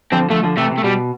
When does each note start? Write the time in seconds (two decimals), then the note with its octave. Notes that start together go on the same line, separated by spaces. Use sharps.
0.12 D3 F3 C4
0.30 D3 F3 A3
0.43 D3 F3
0.57 C3 E3 A3
0.71 C3
0.78 A3
0.84 B2 G3